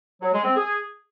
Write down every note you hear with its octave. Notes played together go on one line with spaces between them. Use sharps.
F#3
G#3
C4
G#4